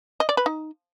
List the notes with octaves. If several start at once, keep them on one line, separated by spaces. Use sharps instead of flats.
D#5
D5
B4
D#4